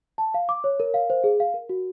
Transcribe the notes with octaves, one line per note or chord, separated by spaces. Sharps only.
A5
F5
D6
C#5
A#4
F5
C5
G#4
F5
A#4
F#4